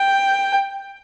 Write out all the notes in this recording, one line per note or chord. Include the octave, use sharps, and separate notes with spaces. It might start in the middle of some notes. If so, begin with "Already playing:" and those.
Already playing: G5